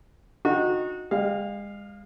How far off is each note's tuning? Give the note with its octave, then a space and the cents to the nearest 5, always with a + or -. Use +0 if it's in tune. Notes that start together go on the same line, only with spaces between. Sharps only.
D#4 -10 F#4 -25
G#3 -40 F5 +0